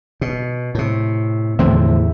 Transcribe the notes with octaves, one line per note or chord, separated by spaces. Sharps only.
B2
A2 C3
E2 A2 D3 F3 C4 E5